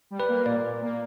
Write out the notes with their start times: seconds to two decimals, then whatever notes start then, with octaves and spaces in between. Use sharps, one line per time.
0.11 G3
0.20 B4
0.29 A#3
0.46 A#2 D5
0.64 A#2
0.81 A#3